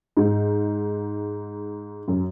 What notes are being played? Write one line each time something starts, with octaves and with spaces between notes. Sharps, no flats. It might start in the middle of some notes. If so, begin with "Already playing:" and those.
G#2
F#2